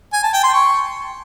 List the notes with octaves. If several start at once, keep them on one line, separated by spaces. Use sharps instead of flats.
G#5
A5
G5
C6
C#6